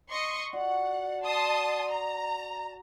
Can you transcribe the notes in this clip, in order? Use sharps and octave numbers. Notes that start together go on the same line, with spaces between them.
D#5 C6 C#6
F#4 D5 F#5
A5 C6 D#6
A#5